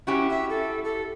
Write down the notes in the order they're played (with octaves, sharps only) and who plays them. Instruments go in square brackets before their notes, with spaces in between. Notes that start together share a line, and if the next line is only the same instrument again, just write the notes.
[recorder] C#4 [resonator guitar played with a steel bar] E4 F#4 G4
[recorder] E5
A4
A4